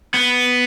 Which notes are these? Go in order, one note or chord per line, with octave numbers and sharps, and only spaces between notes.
B3